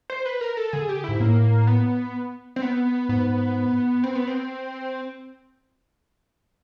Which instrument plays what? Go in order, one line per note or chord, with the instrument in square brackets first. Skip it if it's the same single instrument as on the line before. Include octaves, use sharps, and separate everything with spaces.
[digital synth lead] C5
B4
A#4
A4
[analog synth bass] D3 [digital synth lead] G#4
[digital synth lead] G4
[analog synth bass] G#2 [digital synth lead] E4
[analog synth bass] A2 [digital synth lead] A#3
[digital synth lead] B3
C4
B3
[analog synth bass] G#2 [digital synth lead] B3
[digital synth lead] C4
B3
C4